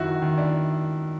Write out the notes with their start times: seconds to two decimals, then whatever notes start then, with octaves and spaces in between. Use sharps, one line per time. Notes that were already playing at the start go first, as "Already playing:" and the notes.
Already playing: F#2 D#3 E4 F#4
0.22 D#3
0.38 D4 E4